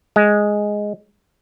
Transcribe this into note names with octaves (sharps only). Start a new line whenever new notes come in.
G#3